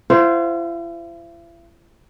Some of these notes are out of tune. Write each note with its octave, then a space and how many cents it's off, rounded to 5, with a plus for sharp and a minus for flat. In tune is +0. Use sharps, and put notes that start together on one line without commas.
E4 +45 C5 -5 F#5 -40